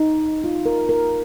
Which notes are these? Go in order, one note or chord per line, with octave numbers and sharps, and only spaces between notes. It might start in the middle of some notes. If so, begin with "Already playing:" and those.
Already playing: D#4
F4
A#4
A#4